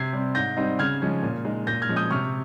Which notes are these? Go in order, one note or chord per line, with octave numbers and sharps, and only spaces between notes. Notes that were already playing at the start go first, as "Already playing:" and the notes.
Already playing: C3 G#6 C7
G3 C4
G#2 G6 A#6
G3 C4 D#4
C#3 F6 G#6
F3 G#3 C#4
A#2
G#3 D#4
A#2 G6 A#6
F6 G#6
F3 G#3 C#4
D#6 G6
C3 C#6 F6